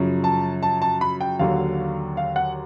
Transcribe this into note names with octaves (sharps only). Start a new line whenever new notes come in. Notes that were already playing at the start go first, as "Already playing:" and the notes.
Already playing: F#2 C#3 F3
A5
A5
A5
B5
G5
D#2 D3 F#3 F5
F5
F#5